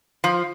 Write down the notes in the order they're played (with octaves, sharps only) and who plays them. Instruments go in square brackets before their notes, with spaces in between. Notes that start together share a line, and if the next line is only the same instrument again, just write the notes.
[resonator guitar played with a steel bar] F3